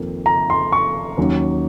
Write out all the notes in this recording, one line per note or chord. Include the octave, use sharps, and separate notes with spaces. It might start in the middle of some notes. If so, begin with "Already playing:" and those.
Already playing: F2 D#3 A#3 D#4
A#5
C6
C#6
D#2 D#3 F#3 C#4